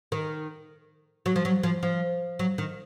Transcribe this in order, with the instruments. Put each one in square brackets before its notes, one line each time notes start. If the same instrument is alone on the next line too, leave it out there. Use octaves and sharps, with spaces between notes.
[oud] D#3
F#3
F3
F#3
F3
F3
F#3
D#3